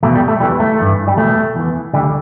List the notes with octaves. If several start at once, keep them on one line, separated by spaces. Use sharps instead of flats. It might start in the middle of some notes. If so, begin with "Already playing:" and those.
E2 B2 A3
G3
A3
E2 E3 G3
A3
G2 E3
G3
E2 B2 A3
E2 E3
D2 D3 G3